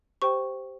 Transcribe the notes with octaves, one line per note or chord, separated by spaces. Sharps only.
G4 C5 G5 C#6